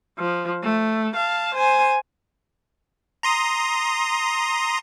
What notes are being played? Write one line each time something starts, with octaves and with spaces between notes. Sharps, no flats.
F3
A3
F5 A5
C5 G#5
A#5 C6 D#6